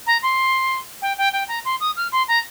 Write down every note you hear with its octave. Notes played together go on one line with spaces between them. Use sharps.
A#5
C6
G5
G5
G5
A#5
C6
D#6
F6
C6
A#5